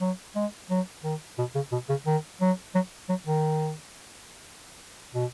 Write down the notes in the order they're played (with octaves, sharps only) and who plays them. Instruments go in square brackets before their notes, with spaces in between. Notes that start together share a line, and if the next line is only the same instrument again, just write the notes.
[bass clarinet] F#3
G#3
F#3
D#3
B2
C#3
B2
C#3
D#3
F#3
F#3
F#3
D#3
B2